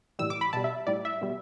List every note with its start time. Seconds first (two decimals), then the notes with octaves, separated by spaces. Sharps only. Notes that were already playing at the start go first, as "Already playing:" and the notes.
0.19 A2 E3 G3 E6
0.30 D6
0.41 B5
0.53 B2 G3 A5
0.64 E5
0.87 A2 G3 D5
1.05 E5
1.21 B2 G3